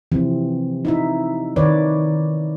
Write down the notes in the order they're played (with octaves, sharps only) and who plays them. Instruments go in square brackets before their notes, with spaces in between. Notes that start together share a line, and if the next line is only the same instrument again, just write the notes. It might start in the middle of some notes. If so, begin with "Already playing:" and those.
[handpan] C3 E3 F3 C4
D#4 E4 E5
D#3 B4 C#5 D5